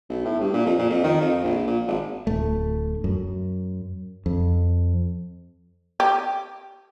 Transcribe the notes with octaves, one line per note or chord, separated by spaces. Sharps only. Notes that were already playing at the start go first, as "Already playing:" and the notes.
B1
A2
G2
A#2
F2
A#2
F2
D#3
F2
A#1
A#2
G#1
D1 A3
F#2
F2
G4